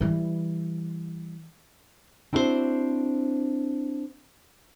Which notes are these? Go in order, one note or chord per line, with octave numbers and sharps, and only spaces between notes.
E3 G3
C4 D4 E4 F#4 A4 C5